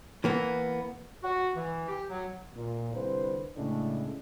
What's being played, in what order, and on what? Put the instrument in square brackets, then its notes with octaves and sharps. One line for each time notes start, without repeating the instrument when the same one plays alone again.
[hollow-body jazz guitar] E3 A#3 B3
[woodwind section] F#4
E3
G4
F#3
[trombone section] A#2
C2 D3 B4 C5
A2 C#3 G#3 A3 D4